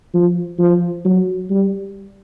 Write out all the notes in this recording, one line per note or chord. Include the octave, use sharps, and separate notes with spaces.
F3
F3
F#3
G3